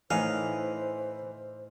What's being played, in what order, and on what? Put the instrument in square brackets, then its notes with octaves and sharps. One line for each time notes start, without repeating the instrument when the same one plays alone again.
[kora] A2 D#4 [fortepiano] E3 [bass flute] C5 [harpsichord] F5